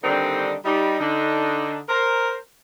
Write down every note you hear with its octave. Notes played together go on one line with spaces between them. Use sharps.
D3 D#3 G3 C4 D4 D#4
G3 D#4
D3 D4 D#4
A#4 C5